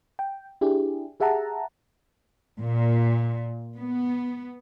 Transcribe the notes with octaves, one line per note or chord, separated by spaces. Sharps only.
G5
D4 E4 G4 G#4
G4 G#4 E5 F#5 A5 A#5
A#2
B3